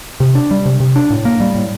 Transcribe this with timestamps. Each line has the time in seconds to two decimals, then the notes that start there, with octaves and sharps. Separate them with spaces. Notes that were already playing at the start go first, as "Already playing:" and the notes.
0.20 C3
0.35 D4
0.51 G3
0.66 C3
0.80 C3
0.96 D4
1.10 A2
1.25 A#3
1.40 G3
1.55 A2